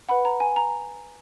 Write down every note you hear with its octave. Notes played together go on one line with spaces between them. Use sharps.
B4 F#5 B5
A#5
G#5
A#5